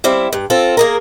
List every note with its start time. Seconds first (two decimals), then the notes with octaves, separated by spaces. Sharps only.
0.04 G3 C4 E4 F5
0.33 G2
0.50 C4 F4 A4
0.77 A#3 G#4 A#4